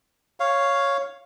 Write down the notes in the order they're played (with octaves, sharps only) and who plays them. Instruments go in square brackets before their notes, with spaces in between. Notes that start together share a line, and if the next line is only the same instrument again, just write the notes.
[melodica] C#5 F5